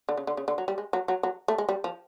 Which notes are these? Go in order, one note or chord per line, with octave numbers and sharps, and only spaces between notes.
D3
C#3
D3
C#3
D3
F#3
G3
G#3
F#3
F#3
F#3
A3
G#3
G3
F3